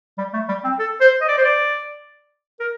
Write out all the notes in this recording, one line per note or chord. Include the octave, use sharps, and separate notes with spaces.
G3
A3
G3
C4
A4
C5
D#5
D5
C5
D5
A#4